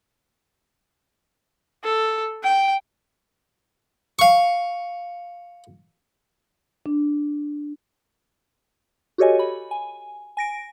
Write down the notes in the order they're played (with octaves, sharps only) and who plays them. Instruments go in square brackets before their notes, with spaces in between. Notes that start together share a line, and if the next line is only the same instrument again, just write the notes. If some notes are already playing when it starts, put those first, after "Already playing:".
[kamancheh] A4
G5
[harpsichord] F5 C#6
[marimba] D4
[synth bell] F#4 G4 A4 C#5 D#5 G#5
B5
G#5
G#5 A#6 D7